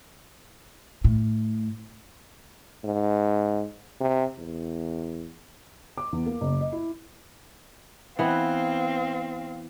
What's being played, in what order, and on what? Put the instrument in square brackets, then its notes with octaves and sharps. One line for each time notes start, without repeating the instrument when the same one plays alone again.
[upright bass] A2
[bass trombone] G#2
C3
E2
[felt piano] D6
E2
A#3
F#1
D#5
E4
[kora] E3 B3 [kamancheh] C4 F5